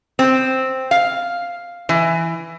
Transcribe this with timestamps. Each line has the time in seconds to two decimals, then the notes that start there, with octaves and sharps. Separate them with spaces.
0.19 C4
0.91 F5
1.89 E3